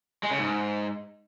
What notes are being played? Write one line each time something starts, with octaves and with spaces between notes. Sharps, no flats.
G#3
C#3
G#2